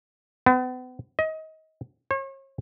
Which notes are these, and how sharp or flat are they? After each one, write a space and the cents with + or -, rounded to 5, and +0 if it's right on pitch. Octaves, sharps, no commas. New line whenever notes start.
B3 +40
D#5 +25
C#5 -40